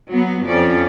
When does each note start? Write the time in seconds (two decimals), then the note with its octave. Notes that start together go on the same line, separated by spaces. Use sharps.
0.11 F#3 B3
0.47 F2 C#4 D5